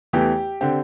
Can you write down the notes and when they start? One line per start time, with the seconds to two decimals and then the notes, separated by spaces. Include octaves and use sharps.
0.13 E2 E3 A3 E4 G4
0.61 D3 C4 G4